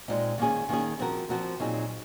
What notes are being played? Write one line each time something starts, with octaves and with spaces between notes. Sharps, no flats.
A#2 G#3 C4 D#4
D#3 A#3 C#4 G#4
D#3 A#3 C#4 G#4
F3 C4 F#4 A#4
F3 C4 F#4 A#4
A#2 F#3 C4 D#4 G#4